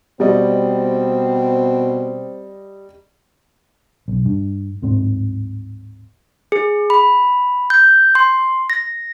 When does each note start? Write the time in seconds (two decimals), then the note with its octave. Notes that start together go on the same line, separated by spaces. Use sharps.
0.20 B2 G3 C4 D5 D#5
4.08 B1
4.25 G2
4.82 D1 G#2 C4
6.52 G#4
6.90 B5
7.70 G6
8.15 C6
8.70 A#6